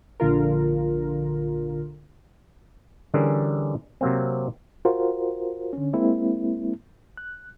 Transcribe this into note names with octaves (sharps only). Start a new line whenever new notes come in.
A#1 D3 F4 A#4
D3 E3 G3 C#4 G#4 A#4
C3 F#3 A#3 C4
F4 F#4 A#4 C5
D3 C#4
G#3 A#3 C4 E4
F#6